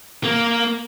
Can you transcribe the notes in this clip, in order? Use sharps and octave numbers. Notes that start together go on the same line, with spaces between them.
A#3